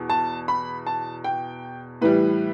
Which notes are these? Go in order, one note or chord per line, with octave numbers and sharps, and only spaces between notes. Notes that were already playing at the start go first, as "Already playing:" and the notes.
Already playing: E2 B2
A5
B5
A5
G5
A2 E3 G3 B4